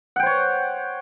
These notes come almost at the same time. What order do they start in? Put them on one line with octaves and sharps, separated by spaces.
F#5 G5 C5 C#5